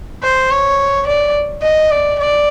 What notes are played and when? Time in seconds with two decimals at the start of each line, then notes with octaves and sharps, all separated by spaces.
0.23 C5
0.51 C#5
1.07 D5
1.62 D#5
1.91 D5
2.19 D5